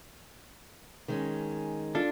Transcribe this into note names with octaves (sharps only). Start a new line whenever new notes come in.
D#3 G#3 C#4
D4 F4 A4